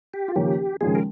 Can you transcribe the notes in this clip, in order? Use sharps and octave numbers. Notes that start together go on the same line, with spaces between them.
G4
F4
D#2 C#3 F3 A#3 C#4 G4
D#2 C#3 F3 G#3 G#4
A#4